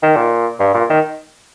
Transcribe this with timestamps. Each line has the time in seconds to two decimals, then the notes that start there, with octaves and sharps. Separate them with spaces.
0.03 D#3
0.16 A#2
0.60 G2
0.74 A#2
0.90 D#3